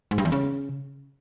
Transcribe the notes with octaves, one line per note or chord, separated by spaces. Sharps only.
G#2
G2
E2
C#3